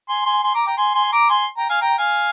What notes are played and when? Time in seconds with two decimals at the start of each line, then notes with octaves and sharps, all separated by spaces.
0.09 G#5 C6
0.26 G#5 C6
0.44 G#5 C6
0.55 A#5 D6
0.66 G5 A#5
0.78 G#5 C6
0.95 G#5 C6
1.12 A#5 D6
1.30 G#5 C6
1.58 G5 A#5
1.70 F5 G#5
1.81 G5 A#5
1.98 F5 G#5